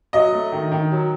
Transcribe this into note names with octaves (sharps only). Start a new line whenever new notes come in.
F#3 D#5
A3
D#3
D#3
F#3